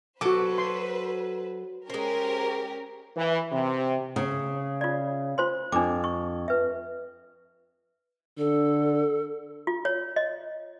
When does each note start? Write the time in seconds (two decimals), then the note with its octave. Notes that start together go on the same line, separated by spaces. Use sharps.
0.21 F#3 F#4 A4 B4 C5 D6
0.58 C6
1.90 G#3 C#4 G4 A#4 C5
3.17 E3
3.52 C3
4.16 C#3
4.81 F4 D5
5.38 F4 C5 C6
5.72 F2 D4 D6
6.04 C#6
6.48 B4 E5
8.38 D3 A4
9.67 F4
9.85 C#5
10.16 D#5